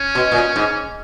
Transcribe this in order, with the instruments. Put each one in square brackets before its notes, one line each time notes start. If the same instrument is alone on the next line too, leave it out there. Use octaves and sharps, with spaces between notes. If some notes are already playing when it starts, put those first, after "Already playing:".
Already playing: [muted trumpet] C#4
[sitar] B2
A#2
G#2